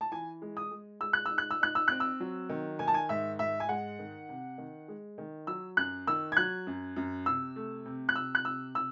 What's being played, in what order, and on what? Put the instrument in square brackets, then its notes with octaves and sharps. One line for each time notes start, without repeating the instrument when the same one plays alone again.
[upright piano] A5
E3 G#5
G#3
D#6
G#3
G#3 E6
F#6
E6
D#4
F#6
E6
D#4 F#6
E6
C4 F#6
E6
F#3
D#3
D#3 G#5
A5
G#5
G#2 E5
G#2 E5
G#5
G#3 F#5
D#3
C3
D#3
G#3
D#3
F#3 E6
F#2 F#6
D#3 E6
G#6
F#3 F#6
F#2
F#2
C3 E6
A3
C3
F#6
C3 E6
F#6
C3 E6
C3 E6